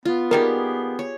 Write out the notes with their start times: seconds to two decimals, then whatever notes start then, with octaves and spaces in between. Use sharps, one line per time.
0.05 B3 F4
0.31 D#3 G3 A#3 G4 G#4 A#4 F5
0.99 C#5